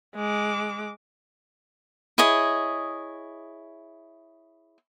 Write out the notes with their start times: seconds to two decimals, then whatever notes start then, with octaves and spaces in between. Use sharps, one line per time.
0.16 G#3 D6
2.18 E4 G#4 C#5 D#5